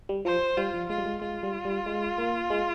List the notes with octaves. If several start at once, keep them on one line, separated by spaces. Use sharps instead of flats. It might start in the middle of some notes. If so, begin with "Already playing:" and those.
G3
F3 C5
G3 F4
F3
G#3 F4
G3
G#3
G#3 F4
G3
G3
G#3
A#3
G#3